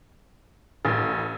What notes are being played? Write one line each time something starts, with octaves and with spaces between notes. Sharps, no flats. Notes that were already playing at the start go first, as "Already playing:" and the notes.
A1